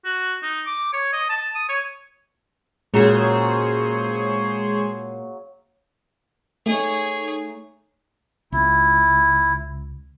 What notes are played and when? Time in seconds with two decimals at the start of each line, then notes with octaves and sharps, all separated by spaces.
0.05 F#4
0.42 D#4
0.66 D6
0.93 C#5
1.13 D#5
1.30 A5
1.55 D#6
1.69 C#5
2.94 A#2 C#3 F#3 G#3 G#4 C5 C#5 C6
6.66 A3 D#4 G#4 C#5
8.52 C#2 E4